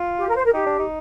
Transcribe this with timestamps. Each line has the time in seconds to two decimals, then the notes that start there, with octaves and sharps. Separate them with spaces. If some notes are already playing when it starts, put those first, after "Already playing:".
Already playing: F4
0.19 G4
0.28 A#4
0.36 C5
0.44 A#4
0.52 D#4 G4
0.66 D4
0.79 D#4